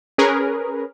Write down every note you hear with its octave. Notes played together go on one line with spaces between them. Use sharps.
C#4 G#4 A#4 B4